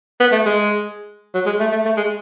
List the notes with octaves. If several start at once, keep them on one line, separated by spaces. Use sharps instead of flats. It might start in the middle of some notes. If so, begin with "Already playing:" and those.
B3
A3
G#3
F#3
G#3
A3
A3
A3
G#3